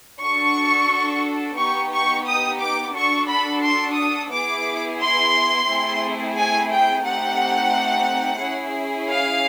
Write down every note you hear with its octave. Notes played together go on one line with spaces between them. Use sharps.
D4 F#4 A4 C#6
B3 D#4 G4 C#6
C#6
D#6
D6
D4 F#4 A4 C#6
B5
C6
D#6
B3 E4 G#4 D6
C6
A3 C4 E4 G#4
G#5
G5
A3 C4 D#4 G4 F#5
C#4 E4 G#4
F5